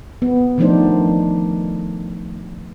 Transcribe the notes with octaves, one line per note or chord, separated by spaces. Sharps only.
B3
D#3 F3 A3 D4 D#4 C5